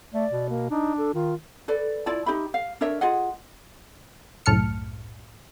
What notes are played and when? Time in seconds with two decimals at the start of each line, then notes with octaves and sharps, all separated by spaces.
0.14 A3 D5
0.32 B2
0.49 A#3
0.71 D4 D#4
0.98 A4
1.14 D#3 F4
1.68 A4 B4 D5
2.06 E4 F4 D5 A5
2.26 D#4 G4 E5 B5
2.54 F5
2.81 D4 A#4 C#5 E5
3.01 F4 G#4 D#5 F#5
4.46 C2 F#2 A2 A5 F6 C#7